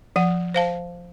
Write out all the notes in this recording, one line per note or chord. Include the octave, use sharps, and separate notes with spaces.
F3 F#5
C5 F5 A5